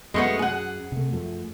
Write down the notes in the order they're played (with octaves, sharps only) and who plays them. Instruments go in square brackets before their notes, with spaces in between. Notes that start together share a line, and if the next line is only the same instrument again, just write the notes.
[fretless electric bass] F#2 [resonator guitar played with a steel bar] G#3 A3 B3
[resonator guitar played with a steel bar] G#4 F#5
[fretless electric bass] C3 A3
F#2 F3 A3